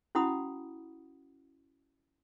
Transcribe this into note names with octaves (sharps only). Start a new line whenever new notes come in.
C#4 E4 F#4 F#5 B5 D#6